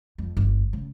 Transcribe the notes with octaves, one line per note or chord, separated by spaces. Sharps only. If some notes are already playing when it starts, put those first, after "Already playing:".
F2
G1
C#3